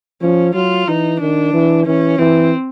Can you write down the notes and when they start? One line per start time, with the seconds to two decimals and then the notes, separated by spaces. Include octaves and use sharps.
0.22 F3 C#4
0.54 F#3 F4
0.88 E3 D#4
1.21 D#3 D4
1.53 E3
1.86 E3 C#4
2.19 E3 C4